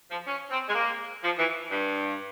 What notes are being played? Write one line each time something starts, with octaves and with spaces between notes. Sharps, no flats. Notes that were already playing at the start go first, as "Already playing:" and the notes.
F3
C#4
C4
G#3
A#3
F3
E3
G2